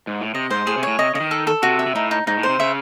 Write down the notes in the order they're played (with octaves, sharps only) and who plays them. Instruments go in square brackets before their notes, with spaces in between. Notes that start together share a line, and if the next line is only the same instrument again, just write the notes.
[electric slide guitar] G#2
A2
[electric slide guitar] C3 [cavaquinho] D#5
[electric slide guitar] G#2 [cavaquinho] C5
[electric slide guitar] A2 [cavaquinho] G#4
[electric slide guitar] C3
[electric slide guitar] A2 [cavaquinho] C#5
[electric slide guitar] C3 [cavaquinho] D#5
[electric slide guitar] C#3 [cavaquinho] D#5
[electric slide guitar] D#3
[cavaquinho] A4
A4
[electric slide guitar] C3 [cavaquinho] F#4
[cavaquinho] E5
[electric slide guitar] C3
[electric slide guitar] A2 [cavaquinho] D#4
[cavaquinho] D#4
[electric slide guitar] G#2 [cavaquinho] D#4
[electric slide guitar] A2
[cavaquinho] C5
[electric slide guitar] C3
[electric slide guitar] C#3 [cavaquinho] E5